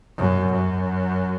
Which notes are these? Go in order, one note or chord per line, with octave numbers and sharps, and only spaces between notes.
F#2
F#2